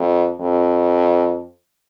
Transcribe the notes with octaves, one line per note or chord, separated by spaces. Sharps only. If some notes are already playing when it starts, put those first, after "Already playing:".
Already playing: F2
F2